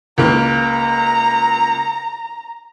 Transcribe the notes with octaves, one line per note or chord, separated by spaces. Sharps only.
C#2 A#3 A#5